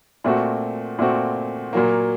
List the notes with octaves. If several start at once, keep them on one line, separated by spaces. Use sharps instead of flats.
A#2 A3 C4 F#4
A#2 A3 C4 F#4
A#2 F#3 A#3